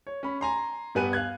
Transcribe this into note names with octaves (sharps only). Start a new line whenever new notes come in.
C#5
C#4 B5
G#5 A#5 C6
G2 G3 B3 G#5 F#6 D#7
F5 F#6 G#6